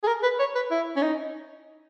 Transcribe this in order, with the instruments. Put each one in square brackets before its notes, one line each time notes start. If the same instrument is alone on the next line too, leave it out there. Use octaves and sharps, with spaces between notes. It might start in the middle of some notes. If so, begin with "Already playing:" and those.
[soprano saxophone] G#4
A#4
B4
C#5
B4
E4
C#4
D#4